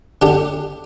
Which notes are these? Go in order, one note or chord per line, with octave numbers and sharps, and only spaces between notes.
D3 D4 G4